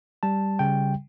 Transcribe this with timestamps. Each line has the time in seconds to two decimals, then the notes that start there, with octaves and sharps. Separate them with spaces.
0.23 G3 A5
0.59 C#3 G5